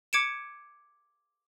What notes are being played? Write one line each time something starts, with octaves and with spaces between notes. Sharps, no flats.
D6 G#6 C#7 D7 E7